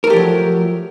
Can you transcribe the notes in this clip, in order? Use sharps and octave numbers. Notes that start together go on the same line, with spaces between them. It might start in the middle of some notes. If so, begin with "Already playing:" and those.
F3 F#3 A3 G4 A#4